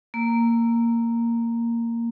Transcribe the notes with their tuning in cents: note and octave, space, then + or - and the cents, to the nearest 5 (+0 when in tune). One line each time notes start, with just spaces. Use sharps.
A#3 -5